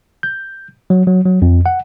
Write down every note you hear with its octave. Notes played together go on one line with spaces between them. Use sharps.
G6
F#3
F#3
F#3
F2
F#5